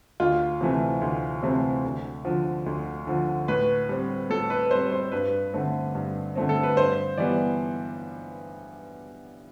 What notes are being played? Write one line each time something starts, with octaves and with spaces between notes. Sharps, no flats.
D2 F4
C3 E3 A3 C4
D2
C3 E3 A3 C4
D2
D3 F3
D2
D3 F3
A2 B4
G3 C4
A2 A4
B4
G3 C4 C5
C5
G2 B4
D3 A3 C4
G2
D3 A3 C4
A4
B4
G2 C5
E3 G3 B3 D5